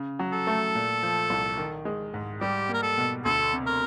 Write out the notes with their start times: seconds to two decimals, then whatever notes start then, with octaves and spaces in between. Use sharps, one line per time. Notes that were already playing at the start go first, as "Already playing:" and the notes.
Already playing: C#3
0.19 F#3
0.33 A4
0.47 A3
0.75 A#2
1.03 F3
1.30 C2
1.57 D#3
1.85 G#3
2.14 G#2
2.41 G3 G4
2.69 A#3
2.74 A#4
2.82 A4
2.98 B2
3.25 D2 A4
3.53 C3
3.66 A#4